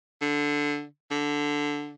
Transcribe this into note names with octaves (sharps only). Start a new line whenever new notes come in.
D3
D3